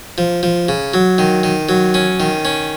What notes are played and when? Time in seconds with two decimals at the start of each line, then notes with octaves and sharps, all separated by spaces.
0.18 F3
0.43 F3
0.68 C#3
0.94 F#3
1.18 D#3
1.43 D#3
1.69 F#3
1.94 C#4
2.20 D#3
2.45 C#4